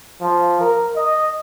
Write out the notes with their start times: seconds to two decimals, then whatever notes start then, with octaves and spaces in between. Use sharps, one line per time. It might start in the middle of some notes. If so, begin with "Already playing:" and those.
0.21 F3
0.60 A#4
0.96 D#5